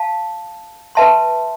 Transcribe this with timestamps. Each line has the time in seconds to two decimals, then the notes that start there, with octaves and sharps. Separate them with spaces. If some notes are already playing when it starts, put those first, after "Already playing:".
Already playing: F5 A5
0.95 B4 E5 A5 C6